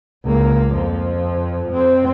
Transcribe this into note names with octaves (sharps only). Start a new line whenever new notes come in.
C#2 A#3
F2 F3
F2 C4